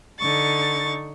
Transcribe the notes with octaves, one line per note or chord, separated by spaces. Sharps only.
D3 D#4 C#6 A6